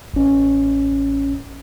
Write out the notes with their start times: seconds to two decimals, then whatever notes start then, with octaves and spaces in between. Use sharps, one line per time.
0.14 A1 C#4